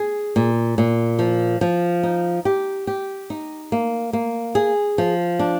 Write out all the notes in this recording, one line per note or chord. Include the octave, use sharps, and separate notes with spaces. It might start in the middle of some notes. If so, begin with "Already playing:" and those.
Already playing: G#4
A#2
A#2
F3
F3
D#4
G4
G4
D#4
A#3
A#3
G#4
F3
D4